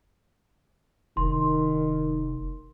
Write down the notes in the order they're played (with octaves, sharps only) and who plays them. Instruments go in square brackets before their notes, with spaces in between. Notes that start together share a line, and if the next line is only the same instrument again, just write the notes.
[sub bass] F1 [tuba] D#3 [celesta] C6